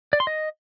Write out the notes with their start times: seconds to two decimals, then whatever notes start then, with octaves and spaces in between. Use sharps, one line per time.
0.13 D5
0.20 C6
0.27 D#5